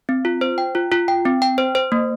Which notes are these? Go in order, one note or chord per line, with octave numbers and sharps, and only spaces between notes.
C4
F4
C5
G5
F4
F4
G5
C4
G5
C5
C5
A#3